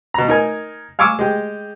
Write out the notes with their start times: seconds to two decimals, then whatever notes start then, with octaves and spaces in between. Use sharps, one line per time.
0.14 B2 A#5
0.28 D#4 A#4 G#5
0.99 F5 G#5 C#6 D6 E6
1.19 G#3 G4